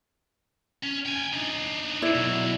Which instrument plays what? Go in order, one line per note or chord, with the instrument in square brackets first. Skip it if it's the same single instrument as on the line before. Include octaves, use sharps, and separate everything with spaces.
[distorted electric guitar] C#4
G5 G#5
D4 D#4
[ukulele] E4 D5
[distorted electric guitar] B2 F#3